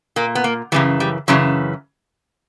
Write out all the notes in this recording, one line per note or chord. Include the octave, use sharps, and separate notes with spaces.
A#2 A#3
B3
A#3
F#2 C#3 E3 G3
G3
F#2 C#3 E3 F#3